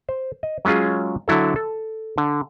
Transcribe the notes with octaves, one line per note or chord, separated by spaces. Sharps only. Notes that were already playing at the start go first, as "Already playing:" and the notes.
C5
D#5
F#3 G#3 C#4 F4 G#4
D3 F#3 E4 A4
A4
D3